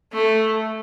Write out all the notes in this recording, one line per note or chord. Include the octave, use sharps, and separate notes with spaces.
A3